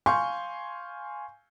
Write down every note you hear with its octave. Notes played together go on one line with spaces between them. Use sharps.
F5 G#5 C6 C#6 G6